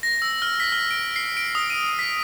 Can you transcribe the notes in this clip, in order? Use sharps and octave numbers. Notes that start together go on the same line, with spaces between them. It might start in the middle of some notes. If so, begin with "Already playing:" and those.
A#6
E6
F6
B6
F6
D7
C7
D7
D#6
D#7
D#7
B6